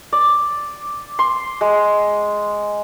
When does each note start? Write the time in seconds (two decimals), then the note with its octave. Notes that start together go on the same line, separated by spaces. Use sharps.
0.12 D5
1.19 C6
1.61 G#3